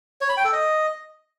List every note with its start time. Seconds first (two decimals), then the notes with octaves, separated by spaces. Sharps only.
0.21 C#5
0.29 B5
0.37 G5
0.45 A4
0.53 D#5